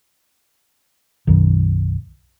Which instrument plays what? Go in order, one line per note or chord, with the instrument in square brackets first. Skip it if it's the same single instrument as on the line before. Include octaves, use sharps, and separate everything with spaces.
[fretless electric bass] B1 F#2 D#3